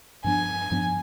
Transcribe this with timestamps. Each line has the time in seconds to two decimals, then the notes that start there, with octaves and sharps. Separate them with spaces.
0.24 G2 F3 B3 D4 G#5
0.71 G2 F3 B3 D4